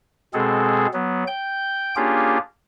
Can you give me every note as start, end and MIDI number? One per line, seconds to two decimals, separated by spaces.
0.34 0.87 47
0.34 0.87 56
0.34 0.87 60
0.34 0.87 68
0.34 0.87 69
0.93 1.24 54
0.93 1.24 59
1.27 1.94 79
1.27 1.94 91
1.96 2.38 58
1.96 2.38 61
1.96 2.38 62
1.96 2.38 65
1.96 2.38 67
1.96 2.38 68